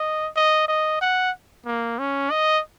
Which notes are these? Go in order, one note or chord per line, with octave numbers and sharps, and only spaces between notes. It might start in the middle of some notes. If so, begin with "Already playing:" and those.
Already playing: D#5
D#5
D#5
F#5
A#3
C#4
D#5